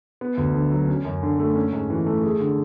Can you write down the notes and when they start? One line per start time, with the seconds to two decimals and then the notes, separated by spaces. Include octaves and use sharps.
0.21 B3
0.38 D2
0.54 D3
0.72 F#3
0.88 C#4
1.05 F#2
1.23 D3
1.39 A3
1.56 C#4
1.73 G#2
1.90 E3
2.06 A3
2.23 G#4
2.40 D3